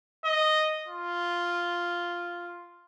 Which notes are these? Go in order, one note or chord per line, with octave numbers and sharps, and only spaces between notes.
D#5
F4